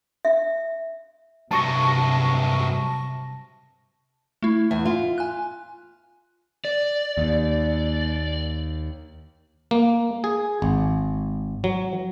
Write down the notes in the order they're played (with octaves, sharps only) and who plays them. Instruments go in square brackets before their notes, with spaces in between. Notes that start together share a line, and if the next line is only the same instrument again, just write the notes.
[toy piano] E5
[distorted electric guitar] G2 F#3 [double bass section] C3 [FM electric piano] A5 C#6 A#6
[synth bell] A3 E4
[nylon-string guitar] E2 [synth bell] E5
[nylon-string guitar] F4
[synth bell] G#5 F#6
[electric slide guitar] D5
[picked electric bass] D#2
[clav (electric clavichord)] A#3
G#4
G#1
F#3